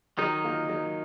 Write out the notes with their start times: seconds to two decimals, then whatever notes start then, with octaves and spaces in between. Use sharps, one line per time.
0.18 D#3 F#3 D#4
0.43 A#3 F4
0.69 F#3